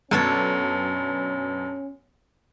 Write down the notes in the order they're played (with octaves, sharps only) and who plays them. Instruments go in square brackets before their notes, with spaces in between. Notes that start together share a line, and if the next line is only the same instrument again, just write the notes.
[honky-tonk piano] F#2 B2 [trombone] C#4 [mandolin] D4 A4 C#5